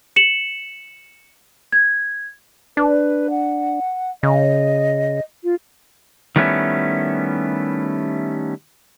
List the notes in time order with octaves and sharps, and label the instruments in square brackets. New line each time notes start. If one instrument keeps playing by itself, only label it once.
[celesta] C#7 E7 F#7
G#6
[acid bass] D4 [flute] B4
[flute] F#5
[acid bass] C#3 [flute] D#5
[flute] F4
[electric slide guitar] D#3 G3 A3 B3 C#4 E4